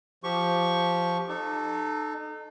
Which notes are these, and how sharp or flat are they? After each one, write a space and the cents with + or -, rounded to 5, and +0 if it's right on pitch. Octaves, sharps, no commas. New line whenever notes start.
F3 +0 G4 +0 C#6 +0
D#4 -30 A4 -10